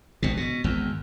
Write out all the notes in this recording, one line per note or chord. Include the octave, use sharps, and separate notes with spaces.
G#1 B2
B2
G#1 E2